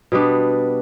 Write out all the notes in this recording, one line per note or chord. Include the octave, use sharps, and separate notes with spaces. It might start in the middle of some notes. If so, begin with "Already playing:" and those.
B2 G3 B3 D4